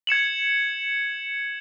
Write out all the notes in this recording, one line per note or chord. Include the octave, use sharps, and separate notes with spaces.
G#6 C#7 E7 F#7